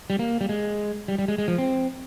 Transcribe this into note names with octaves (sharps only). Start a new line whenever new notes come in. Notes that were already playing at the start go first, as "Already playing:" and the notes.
G3
A#3
G3
G#3
G3
G3
G#3
G#3
F3
C4